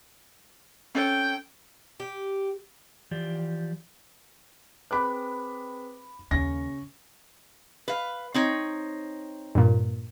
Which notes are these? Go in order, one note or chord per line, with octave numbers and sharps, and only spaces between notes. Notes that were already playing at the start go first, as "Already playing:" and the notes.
C#4 A4 C#5 G5
G4
E3 F3 G4 D5
C4 G#4 B4 B5 D6 F#6
D#2 C#3 C#6 A#6
B4 F5
C4 D#4 C#5
G2 A#2